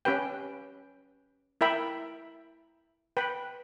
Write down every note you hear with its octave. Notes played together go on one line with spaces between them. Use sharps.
C#4 G4 B4 G5
E4 A#4 E5 G5 B5
B4 G5 B5